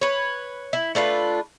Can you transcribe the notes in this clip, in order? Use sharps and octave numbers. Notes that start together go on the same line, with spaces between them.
B4 C#5
E4
A3 D4 F4 B4